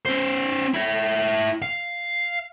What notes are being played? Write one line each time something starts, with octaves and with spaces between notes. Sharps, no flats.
C#4 C5
E4 C#5
F5